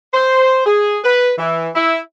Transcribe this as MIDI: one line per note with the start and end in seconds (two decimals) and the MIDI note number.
0.14 0.64 72
0.66 0.99 68
1.04 1.33 71
1.38 1.69 52
1.75 1.99 64